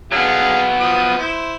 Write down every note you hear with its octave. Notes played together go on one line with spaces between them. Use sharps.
D3 F#3 B3 G#4 F5
F3 D#6
E4 C5